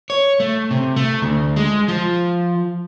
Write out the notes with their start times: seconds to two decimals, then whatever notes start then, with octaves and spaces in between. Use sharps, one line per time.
0.10 C#5
0.40 A3
0.71 C3
0.96 A3
1.22 D2
1.56 G#3
1.88 F3